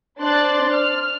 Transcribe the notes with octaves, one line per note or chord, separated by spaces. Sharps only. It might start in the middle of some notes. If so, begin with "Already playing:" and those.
D4 C5 D5 C6 F#6 A6
F6